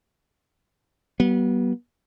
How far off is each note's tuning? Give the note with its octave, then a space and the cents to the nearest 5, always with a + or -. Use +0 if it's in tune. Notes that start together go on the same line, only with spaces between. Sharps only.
G3 -45 B3 -30